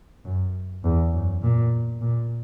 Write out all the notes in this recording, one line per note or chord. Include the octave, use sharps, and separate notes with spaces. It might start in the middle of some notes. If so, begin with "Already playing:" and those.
F#2
E2
F#2
A#2
A#2